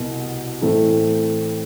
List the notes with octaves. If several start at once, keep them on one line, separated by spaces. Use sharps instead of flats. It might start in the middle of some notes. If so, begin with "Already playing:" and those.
Already playing: C2 B2 B3
A2 E3 A3 C4